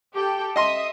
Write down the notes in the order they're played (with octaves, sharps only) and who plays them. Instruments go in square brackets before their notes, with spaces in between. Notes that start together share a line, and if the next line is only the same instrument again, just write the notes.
[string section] G4 A4 G5
[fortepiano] D#5 C6 [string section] E5 D#6